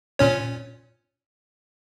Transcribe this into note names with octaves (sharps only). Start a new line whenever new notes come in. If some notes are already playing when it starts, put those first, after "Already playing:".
A#2 C#4 C#5